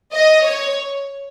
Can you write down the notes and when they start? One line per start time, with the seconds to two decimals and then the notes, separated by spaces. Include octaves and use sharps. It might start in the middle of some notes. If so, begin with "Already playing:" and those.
0.13 D#5
0.44 C#5